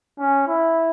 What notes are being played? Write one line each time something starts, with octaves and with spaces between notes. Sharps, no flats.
C#4
E4